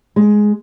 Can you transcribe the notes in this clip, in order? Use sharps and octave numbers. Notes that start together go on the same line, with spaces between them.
G#3